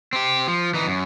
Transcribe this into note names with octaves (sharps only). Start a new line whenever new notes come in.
C4 G4
F3
E3 D#4
F#2